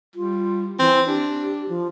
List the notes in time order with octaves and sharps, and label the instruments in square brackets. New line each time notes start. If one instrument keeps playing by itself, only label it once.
[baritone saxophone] G3 [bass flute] F4
[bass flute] E3 [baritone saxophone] C4
[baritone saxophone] D4 [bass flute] G4
[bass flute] F3